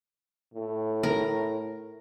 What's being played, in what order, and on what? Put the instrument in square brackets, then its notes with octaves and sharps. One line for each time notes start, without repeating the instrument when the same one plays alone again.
[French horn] A2
[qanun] A#4